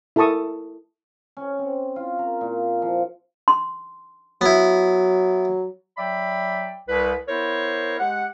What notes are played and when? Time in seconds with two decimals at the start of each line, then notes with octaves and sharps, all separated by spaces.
0.16 E4 A4 A#4 A5 C#6 D#6
1.37 C#4
1.59 C4
1.96 F4
2.19 A#4
2.41 A#2
2.82 F3
3.48 C6
4.41 F#3 B3 E4
5.98 F#3 D5 E5 G5 B5
6.88 C2 B4
7.27 B3 E4 A#4 C5 C#5
8.00 G#3 G4 F#5